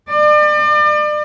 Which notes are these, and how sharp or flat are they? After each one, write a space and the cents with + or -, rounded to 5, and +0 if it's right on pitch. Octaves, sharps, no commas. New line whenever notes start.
D5 +40